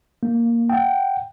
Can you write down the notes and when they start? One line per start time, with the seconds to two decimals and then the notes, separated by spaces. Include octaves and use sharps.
0.23 A#3
0.70 F#5 G5